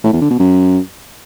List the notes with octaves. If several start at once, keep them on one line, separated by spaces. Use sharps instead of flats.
A2
E2
D3
B2
F#2